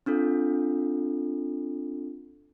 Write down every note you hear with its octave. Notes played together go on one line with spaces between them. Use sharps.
C4 D4 F4 A4